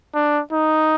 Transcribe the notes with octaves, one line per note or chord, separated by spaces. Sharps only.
D4
D#4